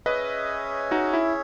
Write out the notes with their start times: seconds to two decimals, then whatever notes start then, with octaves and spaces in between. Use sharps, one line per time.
0.06 C#4 G#4 B4 C#5 D#5 E5
0.91 D#4 F#4
1.13 E4